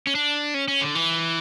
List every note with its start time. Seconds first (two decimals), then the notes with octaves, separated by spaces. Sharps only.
0.07 C#4
0.15 D4
0.54 C#4
0.68 C#4
0.81 D3
0.95 E3